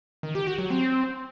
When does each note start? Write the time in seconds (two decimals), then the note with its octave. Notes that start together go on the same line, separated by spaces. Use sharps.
0.23 D#3
0.35 G4
0.47 F#4
0.59 F#3
0.70 C4